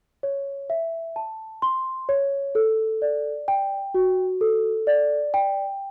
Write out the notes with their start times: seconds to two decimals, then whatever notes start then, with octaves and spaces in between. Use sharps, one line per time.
0.23 C#5
0.70 E5
1.16 A5
1.62 C6
2.09 C#5
2.55 A4
3.02 D5
3.48 G5
3.94 F#4
4.41 A4
4.87 D5
5.34 G5